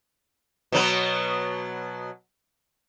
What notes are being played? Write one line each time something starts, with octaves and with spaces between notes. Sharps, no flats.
B2 F#3 B3